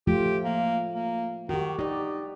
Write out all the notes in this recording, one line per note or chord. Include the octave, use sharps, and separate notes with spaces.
F3 A3 F4 G4
A#3
A#3
D#3 F#4 G4
D#4 G4 D5